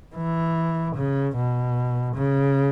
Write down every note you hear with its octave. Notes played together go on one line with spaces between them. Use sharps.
E3
C#3
B2
C#3